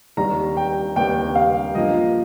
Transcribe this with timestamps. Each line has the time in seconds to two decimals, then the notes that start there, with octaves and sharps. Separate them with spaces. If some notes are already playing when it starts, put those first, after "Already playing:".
0.17 D#2 D#3 G3 A#5
0.57 G5
0.96 D#2 D#3 G3 G5
1.35 F5
1.75 G2 F3 A#3 D#5